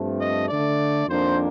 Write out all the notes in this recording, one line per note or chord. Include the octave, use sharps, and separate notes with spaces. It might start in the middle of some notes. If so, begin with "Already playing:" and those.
Already playing: G2 F3 A3 C4
D#5
D3 A3 D4 D5
F2 D#3 A#3 D4 C5